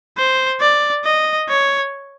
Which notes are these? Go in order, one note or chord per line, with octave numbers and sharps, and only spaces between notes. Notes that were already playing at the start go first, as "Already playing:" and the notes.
C5
D5
D#5
C#5